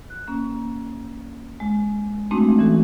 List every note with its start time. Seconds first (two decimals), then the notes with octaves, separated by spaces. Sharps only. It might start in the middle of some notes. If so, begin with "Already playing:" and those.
0.10 F#6
0.28 A#3 C#4
1.60 G#3
2.31 G#3 A3 C4 D4 D#4 F#4
2.59 E3 C#4 F#4 A4